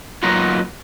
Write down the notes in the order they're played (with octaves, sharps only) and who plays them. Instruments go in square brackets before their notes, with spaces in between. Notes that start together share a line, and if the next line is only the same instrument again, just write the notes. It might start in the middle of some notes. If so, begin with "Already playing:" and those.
[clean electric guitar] F#3 A#3 B3 D#4 F4 F#4